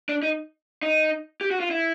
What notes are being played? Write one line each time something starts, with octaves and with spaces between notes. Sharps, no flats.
D4
D#4
D#4
G4
F#4
F4
E4